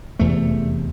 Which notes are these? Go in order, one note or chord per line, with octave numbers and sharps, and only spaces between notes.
F1 E2 C3 A3